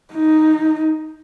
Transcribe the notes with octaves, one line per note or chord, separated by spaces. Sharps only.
D#4